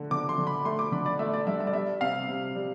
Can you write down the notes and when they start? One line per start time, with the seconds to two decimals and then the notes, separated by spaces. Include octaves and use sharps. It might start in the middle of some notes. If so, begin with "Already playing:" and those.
Already playing: D3 A3
0.11 D3 D6
0.29 C6
0.38 D3
0.47 B5
0.65 A3 C6
0.79 D6
0.92 D3 B5
1.06 D5
1.19 A3 E5
1.34 D5
1.47 G2 E5
1.60 E5
1.67 D5
1.73 G3 E5
2.01 C3 F5
2.28 C3
2.55 G3